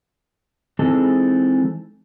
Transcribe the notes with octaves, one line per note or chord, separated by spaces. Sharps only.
E3 G#3 C4 D#4 G#4 A4